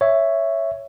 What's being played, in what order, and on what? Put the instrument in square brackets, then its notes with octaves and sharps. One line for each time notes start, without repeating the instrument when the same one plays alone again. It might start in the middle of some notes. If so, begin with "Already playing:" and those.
[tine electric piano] C#5 E5